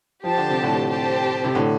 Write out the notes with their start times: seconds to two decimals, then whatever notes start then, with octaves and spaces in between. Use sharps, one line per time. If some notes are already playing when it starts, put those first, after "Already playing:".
0.24 F3 G4 C5 A5
0.37 D3
0.50 C3
0.63 A2 D3
0.90 C4 G4 C5 A5
1.45 C3
1.55 A2 D3